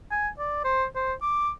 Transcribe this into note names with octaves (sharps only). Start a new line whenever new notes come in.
G#5
D5
C5
C5
D6